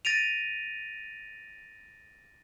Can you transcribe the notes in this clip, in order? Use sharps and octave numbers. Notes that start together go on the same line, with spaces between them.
A6 A#6 D7 D#7 F7